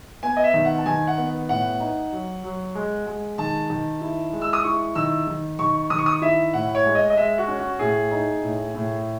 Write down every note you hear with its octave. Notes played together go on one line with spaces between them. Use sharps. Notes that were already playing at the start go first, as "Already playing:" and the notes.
B3 G#5
D#5
E5
D#3
F#5
A5
D#3 G#5
F#5
B3
A2 F#5
D#4
F#3
F#3
G#3
G#3
D#3 A5
D#3
E4
G#3
E6
D#6
E4 C#6
D#3 E6
D#3
D#3 C#6
D#3 D#6
C#6
D#6
E4 E5
A2 F#5
C#5
G#3
D#5
D#5
G#3 E5
F#4
C#4
F#4
A2 G#4
D#4
A2
A2